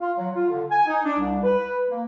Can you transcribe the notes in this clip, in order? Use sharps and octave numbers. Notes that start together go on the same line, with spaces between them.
F4
F#3
F4
D3
G#5
D#4
D4
C2
B4
A#3